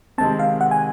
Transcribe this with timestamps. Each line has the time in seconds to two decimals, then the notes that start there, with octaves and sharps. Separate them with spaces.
0.18 C3 D#3 G#3 C4 A5
0.39 F5
0.61 F#5
0.71 G#5